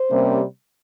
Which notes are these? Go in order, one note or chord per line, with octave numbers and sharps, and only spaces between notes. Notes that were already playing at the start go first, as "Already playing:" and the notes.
Already playing: C5
C3 G3 A#3 C#4